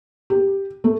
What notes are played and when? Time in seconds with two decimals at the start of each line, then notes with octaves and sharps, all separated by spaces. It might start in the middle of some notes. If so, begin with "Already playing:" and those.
0.30 G4
0.84 A3